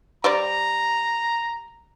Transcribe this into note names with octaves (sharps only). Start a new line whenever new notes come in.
G3 C5 D5 A#5